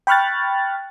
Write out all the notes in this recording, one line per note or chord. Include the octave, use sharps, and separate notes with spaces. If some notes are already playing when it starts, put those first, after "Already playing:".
G5 B5 C#6 F6 F#6 A6